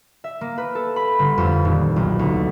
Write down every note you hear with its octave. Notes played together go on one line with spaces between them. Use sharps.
E5
A#3
B4
A4
B5
G1
F2
D#1
B1
D2